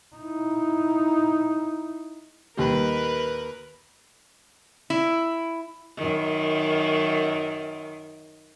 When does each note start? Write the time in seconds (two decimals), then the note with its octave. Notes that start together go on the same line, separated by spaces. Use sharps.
0.16 D#4 E4
2.57 D#2 G3 A#4 B4
4.90 E4
5.97 F#2 D#3